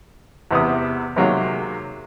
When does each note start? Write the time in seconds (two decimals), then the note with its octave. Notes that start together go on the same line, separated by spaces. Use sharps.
0.51 E2 C3 B3 D#6
1.16 C3 D#3 F#3 G#3 A#3